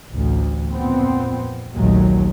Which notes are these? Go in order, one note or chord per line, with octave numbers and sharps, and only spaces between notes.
A1 D2
F2 A#2 B3 C4
A#1 D#2 A#2 F#3 G#3 A3